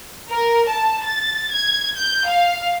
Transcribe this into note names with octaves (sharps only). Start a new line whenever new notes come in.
A#4
A5
A6
G#6
G6
F5